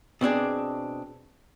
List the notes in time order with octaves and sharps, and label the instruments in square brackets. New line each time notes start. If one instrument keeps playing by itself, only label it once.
[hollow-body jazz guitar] B2 C4 D4 G#4